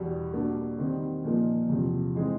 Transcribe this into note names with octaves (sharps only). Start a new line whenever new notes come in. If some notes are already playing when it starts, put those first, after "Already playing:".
Already playing: E2 B2 G3
B2 G3 A#3 D4
D#3 G3 C4
A#2 F3 A#3 D#4
E2 C3 F3
E3 G#3 C4 D#4